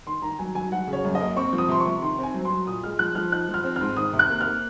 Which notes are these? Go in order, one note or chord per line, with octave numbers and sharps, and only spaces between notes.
D#3 C6
D#3 A#5
F#3 G#5
F#3 G#5
F#3 F#5
C#3
C#5
F#2
D#5
A#3
C4 C#6
F3
D#6
C3 C6
C#6
C3
D#3 C6
C4 G#5
F#3
C6
F#3
A#2 D#6
G#3 F6
F3 F#6
F3 F6
D#4 F#6
F3
F6
C4
G#2 F6
D#3 D#6
C3
F#6
A#3
A#3 F6